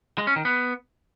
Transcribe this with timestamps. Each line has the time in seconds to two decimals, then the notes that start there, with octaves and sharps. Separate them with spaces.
0.18 G#3
0.27 C#4
0.36 D#3
0.45 B3